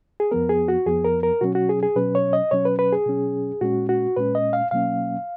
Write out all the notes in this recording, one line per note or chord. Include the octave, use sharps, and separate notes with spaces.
G#4
F2 F3 B3 A#4
G#4
F#4
F2 F3 B3 G#4
A#4
A#4
B2 F#3 C#4 F#4
F#4
G#4
G#4
B2 F#3 C#4 B4
C#5
D#5
B2 F#3 C#4 C#5
B4
B4
G#4
B2 F#3 C#4
A#2 G#3 C#4 F#4
F#4
A#2 G#3 C#4 B4
D#5
F5
B2 F#3 A#3 C#4 F5